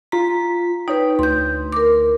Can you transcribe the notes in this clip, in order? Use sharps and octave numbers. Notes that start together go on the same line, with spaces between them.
F4 A#5 B6
D#4 B4 C#5 G5
D2 C6 G6
A#4 D6